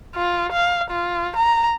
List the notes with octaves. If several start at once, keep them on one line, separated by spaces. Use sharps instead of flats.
F4
F5
F4
A#5